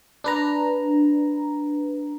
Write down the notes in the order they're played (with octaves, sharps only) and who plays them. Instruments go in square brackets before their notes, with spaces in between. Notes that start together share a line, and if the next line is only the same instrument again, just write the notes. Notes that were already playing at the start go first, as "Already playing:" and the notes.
[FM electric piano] D4 B4 A#5